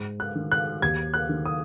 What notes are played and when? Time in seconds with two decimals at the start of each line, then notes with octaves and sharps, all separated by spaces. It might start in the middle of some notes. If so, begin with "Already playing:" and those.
Already playing: G#2
0.20 F#6
0.35 D#3
0.52 F#6
0.82 D#2 G#6
1.14 F#6
1.29 D#3
1.46 D#6